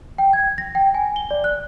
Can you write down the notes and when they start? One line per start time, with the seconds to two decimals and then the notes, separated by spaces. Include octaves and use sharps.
0.18 G5
0.33 G#6
0.58 A#6
0.75 G5
0.95 G#5
1.16 G7
1.31 D5
1.44 F#6